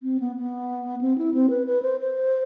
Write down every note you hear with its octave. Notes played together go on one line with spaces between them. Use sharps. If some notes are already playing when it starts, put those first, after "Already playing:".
C4
B3
B3
C4
E4
C4
B4
B4
C5
C5